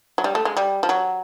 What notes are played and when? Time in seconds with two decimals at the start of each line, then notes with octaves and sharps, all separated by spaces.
0.18 F#3
0.24 G3
0.35 A3
0.45 G#3
0.57 G3
0.83 F3
0.89 F#3